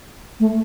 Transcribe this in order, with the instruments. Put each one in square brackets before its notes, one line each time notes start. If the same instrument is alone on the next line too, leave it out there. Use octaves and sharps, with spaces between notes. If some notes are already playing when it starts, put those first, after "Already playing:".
[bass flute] A3